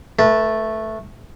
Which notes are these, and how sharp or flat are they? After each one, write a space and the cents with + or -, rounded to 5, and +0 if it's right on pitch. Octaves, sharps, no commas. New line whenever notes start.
A3 +0 B4 -30 A5 +0